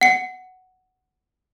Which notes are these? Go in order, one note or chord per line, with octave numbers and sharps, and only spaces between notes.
F#5 C#7